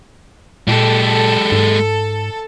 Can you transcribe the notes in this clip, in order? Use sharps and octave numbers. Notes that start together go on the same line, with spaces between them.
A#2 G#3 G4 A4
G#2